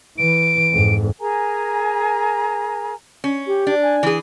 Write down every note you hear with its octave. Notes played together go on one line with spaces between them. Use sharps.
E3 D7
F2 G#2
G#4 A#4 G#5 A#5
C#4
G4
D4
G#5
E3 G#4